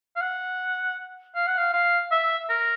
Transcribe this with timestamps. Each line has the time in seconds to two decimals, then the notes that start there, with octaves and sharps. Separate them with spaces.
0.16 F5
0.21 F#5
1.35 F5
1.47 F#5
1.58 F5
1.73 F5
2.12 E5
2.49 A#4